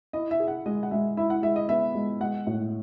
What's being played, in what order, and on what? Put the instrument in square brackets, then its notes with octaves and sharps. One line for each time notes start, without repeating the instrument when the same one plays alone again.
[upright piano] E4 [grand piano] D#5
[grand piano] E5
[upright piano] G#4
[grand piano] F#5
[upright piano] G#3 [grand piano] D#5
[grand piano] F#5
[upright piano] G#3 [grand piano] E5
[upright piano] E4 [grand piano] E5
[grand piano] F#5
[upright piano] G#3 [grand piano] E5
[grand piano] D#5
[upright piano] B3 [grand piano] E5
[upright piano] G#3
[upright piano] G#3 [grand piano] F#5
[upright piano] A2